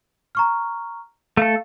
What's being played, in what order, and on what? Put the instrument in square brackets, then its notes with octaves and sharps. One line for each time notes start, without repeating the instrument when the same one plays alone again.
[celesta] A#5 C#6 F6
[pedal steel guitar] A3 A4 [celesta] F5